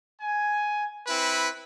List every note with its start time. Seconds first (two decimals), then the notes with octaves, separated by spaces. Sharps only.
0.21 G#5
1.07 C4 E4 B4